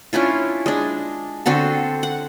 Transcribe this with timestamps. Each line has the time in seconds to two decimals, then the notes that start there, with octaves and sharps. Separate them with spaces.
0.13 C#4 D4 E4 F4
0.66 G#3 D4
1.46 D3 C4 F#4 A4
2.03 F#5